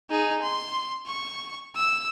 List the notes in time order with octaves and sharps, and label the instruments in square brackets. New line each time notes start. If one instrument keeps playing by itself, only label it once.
[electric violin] D#4 G#4
C6
C#6
E6